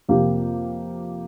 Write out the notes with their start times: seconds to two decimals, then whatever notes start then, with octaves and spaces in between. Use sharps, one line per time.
0.09 F2 C3 A#3 G4